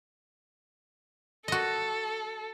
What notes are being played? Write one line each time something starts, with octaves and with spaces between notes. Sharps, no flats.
F#4 A4 D#5